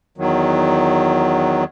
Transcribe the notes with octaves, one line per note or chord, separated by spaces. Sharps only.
E2 D#3 F#3